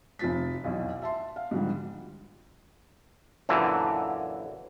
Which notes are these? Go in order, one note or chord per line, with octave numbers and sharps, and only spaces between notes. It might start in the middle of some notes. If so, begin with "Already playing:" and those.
F1 F3 F4 A6 B6
B1 E2 B2
E5 A5 C6
F5
G#2 D3 F3 G3
F#2 A#2 D3 E3